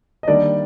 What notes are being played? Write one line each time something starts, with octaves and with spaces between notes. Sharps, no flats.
D#5
D#3 G3 A#3 D4 D5